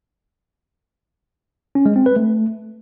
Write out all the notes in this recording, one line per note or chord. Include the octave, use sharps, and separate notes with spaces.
C#4
G#3
C4
B4
A3